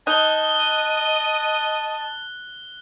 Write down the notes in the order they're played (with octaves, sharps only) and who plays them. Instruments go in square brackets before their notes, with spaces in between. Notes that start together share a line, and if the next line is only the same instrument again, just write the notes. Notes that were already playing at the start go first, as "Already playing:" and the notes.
[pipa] D#4 [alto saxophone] D#5 [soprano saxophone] A5 [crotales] F#6 G7